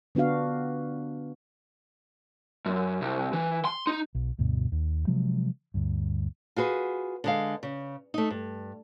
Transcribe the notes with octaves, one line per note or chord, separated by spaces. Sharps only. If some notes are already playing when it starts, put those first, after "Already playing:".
D3 B3 D4 F#4 F5
F#2
C2
E3
C6
D#4
B1
D2 G2 B2
D#2
C3 F3 F#3 G#3
D2 G2
F4 F#4 G#4 B4
D3 G#3 F5
C#3
A3 D#4
G2